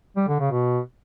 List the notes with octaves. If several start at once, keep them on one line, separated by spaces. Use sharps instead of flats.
G3
D3
C#3
B2